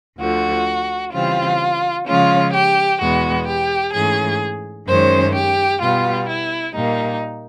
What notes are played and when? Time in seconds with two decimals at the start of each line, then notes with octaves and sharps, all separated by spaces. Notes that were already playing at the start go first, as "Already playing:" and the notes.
0.19 D2 D3 F3 F#4
1.13 C#3 E3 G3 C4 F4
2.06 C#3 F3 G#3 C#4 F4
2.54 G4
3.01 E2 B2 G#3 B3 F#4
3.47 G4
3.94 G#2 E3 A3 C#4 G#4
4.88 F#2 D#3 G#3 C#4 C5
5.34 G4
5.82 B2 G3 B3 F4
6.29 E4
6.75 A#2 G3 A#3 D#4